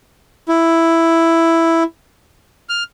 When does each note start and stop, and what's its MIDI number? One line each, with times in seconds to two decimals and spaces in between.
0.48 1.83 64
2.69 2.83 89